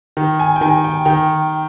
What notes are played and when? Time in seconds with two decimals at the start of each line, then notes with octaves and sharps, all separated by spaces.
0.17 D#3
0.39 G#5
0.56 G5
0.61 D#3 G#5
0.84 G5
1.05 D#3 G5